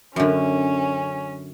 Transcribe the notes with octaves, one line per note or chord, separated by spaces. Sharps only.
F#2 D3 C#4